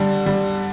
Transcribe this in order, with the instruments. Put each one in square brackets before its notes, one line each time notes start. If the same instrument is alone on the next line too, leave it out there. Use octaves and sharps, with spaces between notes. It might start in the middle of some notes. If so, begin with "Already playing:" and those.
Already playing: [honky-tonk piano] D3 G3
G3